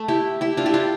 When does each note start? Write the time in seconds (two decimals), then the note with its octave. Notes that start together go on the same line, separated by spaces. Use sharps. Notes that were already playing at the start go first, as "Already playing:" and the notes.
Already playing: A3
0.08 E4 G4
0.41 E4 G4
0.57 D4 F4
0.66 E4 G4
0.74 D4 F4